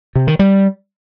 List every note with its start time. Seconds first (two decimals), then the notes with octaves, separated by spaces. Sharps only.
0.16 C3
0.27 D#3
0.39 G3